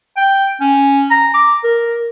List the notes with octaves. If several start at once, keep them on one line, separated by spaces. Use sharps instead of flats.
G5
C#4
A#5
D6
A#4